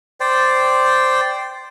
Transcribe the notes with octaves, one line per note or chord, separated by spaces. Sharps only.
C5 D5 G5